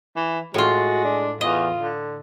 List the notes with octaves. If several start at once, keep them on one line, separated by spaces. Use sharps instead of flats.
E3
A2 G#3 F4 F#4
D4
E2 F4 D#5
D3